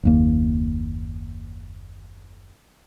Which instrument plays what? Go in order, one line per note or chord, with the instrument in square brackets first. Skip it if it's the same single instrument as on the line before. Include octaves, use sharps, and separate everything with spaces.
[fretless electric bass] F#1 D#2 A#3